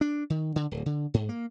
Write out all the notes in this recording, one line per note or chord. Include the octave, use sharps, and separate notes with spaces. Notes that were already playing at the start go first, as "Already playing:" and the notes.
D4
D#3
D3
D1
D3
G#2
A#3